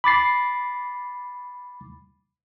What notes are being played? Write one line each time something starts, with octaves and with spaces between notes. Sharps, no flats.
B5 D6 A6 C7